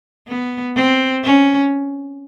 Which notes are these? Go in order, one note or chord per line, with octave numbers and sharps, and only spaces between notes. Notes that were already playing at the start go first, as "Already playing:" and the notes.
B3
C4
C#4